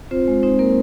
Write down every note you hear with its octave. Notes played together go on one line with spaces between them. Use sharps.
C4 F4 C5
G#3
C4 D#4 C5
A#3 A#4